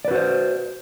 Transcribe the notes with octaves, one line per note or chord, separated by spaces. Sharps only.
F#4 B4 C5 D5